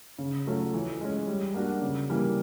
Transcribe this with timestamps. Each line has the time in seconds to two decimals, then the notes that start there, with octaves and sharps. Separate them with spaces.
0.18 C#3
0.46 F#3 A3 C#4 F4
0.74 E3
1.01 G#3 C#4
1.27 G3
1.54 A#3 D4 F#4
1.82 C#3
2.10 E3 G3 A#3